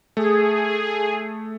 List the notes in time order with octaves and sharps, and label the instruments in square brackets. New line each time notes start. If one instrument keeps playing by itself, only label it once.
[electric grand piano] A3 [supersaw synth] G#4